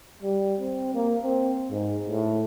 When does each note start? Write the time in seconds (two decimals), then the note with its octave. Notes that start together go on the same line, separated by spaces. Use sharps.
0.23 G3
0.60 C4
0.94 A#3
1.23 C4
1.70 G#2
2.09 A2